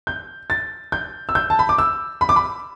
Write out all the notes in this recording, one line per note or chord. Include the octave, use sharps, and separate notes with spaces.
G6
A6
G6
E6
G6
A5
B5
D6
E6
B5
D6
B5